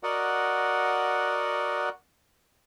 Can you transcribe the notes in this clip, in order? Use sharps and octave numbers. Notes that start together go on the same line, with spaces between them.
F#4 A#4 D5 D#5 F#5